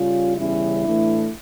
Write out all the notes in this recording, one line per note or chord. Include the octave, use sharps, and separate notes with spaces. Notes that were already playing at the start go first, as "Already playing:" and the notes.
Already playing: C#3 G3 C#4 F4
E2 C#3 G3 C#4 E4
A2 E3 A3 D4